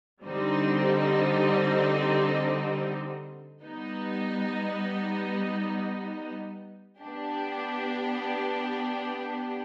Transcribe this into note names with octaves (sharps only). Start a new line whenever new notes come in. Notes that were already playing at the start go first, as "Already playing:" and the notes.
D3 G3 C4 D#4
G3 B3 D#4
B3 D4 G4